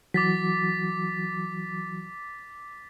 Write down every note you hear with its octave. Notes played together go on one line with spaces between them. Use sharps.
E3 F#3 F#4 D6 A6 B6